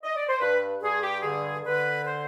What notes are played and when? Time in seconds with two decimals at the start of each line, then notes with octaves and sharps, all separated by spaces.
0.03 D#5
0.16 D5
0.28 C5
0.40 G2 B4
0.81 G2 G#4
1.02 G4
1.22 D3 G#4
1.64 D3 B4
2.05 C5